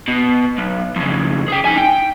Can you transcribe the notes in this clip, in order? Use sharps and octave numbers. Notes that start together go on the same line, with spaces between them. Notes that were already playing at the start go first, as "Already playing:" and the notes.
B2
B1
F2 C#3
G#4 G5
D#4 G#5
G5